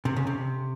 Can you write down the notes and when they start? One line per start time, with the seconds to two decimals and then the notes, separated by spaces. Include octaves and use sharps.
0.05 C3
0.17 C#3
0.27 C3